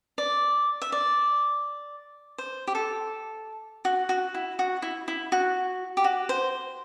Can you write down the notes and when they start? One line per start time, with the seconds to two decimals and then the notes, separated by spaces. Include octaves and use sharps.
0.18 D5
0.82 E5
0.92 D5
2.38 C5
2.67 G4
2.75 A4
3.85 F#4
4.09 F#4
4.34 E4
4.59 F#4
4.82 E4
5.08 E4
5.32 F#4
5.97 G4
6.04 F#4
6.29 C5